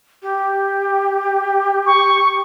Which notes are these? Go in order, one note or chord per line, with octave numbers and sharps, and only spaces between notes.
G4
C#6